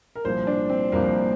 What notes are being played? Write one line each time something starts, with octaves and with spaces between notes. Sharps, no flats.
A#4
C2 A#2 F3 C5
D4
C4
C2 A#2 F3 A#3